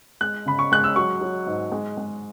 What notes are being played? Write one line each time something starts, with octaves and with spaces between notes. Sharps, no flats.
G#3 F#6
C#3 B5
C#6
G#3 F#6
E6
F#3 C#6
F#3
G#2
G#3
G#3